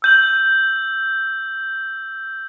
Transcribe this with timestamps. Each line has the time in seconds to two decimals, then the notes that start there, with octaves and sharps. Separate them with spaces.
0.02 E6 G6 F#7